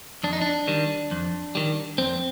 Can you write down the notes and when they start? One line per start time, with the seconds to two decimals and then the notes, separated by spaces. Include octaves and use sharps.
0.23 F2 D4
0.33 D#4
0.41 D4
0.68 D#3 G3
1.11 F2
1.55 D#3 G3
1.98 F2 C4